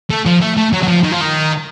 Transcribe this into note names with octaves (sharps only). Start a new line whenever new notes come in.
A3
F3
A3
A3
F#3
F#3
F3
D#3
F3
D#3